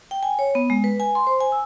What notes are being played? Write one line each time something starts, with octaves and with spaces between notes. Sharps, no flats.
G5
G#5
C#5
B3
G#3
B4
G#5
C6
C5
G#5
E6